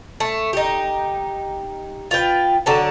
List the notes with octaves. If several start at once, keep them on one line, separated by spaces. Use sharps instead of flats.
A3
D#4 G4
F4 B4 G5
D3 F#3 D4 A4